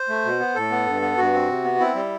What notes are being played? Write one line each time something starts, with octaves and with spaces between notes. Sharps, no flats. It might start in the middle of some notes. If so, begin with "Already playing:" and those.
Already playing: C5
A3
B2
B3
A2 A4
B3
G2
B3
G2 F#4
C4
C3
B3
C4 E4
G3